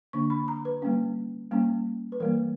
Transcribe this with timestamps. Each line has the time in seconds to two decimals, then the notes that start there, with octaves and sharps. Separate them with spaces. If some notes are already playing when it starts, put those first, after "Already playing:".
0.13 D3 A#3 D4 C#6
0.30 B5
0.48 A#5
0.65 B4
0.82 G3 A#3 C#4
1.51 G3 A#3 C#4
2.12 B4
2.20 E3 G3 A#3 A#4